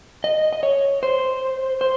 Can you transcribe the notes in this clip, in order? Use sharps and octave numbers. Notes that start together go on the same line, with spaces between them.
D#5
D#5
C#5
C5
C5